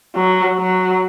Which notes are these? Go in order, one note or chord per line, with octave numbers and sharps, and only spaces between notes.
F#3
F#3